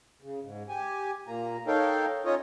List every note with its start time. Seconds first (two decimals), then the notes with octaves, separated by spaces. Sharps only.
0.22 C#3
0.43 G#2
0.69 G4 G#5
1.28 A#2 A#3 A#5
1.67 D#4 A4 A#4 C#5 F5 G5
2.25 C#4 D#4 F4 C#5 D#5